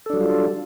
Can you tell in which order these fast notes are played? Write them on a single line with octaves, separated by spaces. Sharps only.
A4 D4 F#3 G3 F4